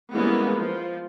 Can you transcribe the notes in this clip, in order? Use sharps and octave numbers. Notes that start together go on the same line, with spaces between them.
E3 G3 G#3 A#3 B3 C#4
F3 F4